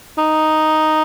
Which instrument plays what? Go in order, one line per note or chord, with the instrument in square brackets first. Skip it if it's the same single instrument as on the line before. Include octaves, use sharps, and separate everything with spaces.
[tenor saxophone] D#4